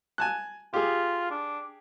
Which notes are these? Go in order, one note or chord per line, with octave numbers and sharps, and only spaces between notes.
G#5 A5 F#6
F4 G4 G#4
D4